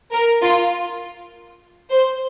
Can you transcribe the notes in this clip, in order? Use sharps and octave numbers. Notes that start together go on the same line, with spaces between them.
A#4
F4
C5